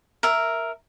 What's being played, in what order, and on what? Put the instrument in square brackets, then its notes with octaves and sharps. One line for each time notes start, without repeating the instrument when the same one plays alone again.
[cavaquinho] A#4 E5